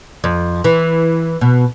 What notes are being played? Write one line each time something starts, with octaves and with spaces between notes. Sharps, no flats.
F2
E3
B2